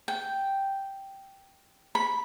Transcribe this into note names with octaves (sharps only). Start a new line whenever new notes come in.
G5
B5